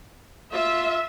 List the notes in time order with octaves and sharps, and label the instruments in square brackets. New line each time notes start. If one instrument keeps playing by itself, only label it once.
[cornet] F4 [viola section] E5